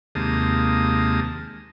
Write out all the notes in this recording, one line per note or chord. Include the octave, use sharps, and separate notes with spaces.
D#2 C3 G#3 A#3 A5 D#6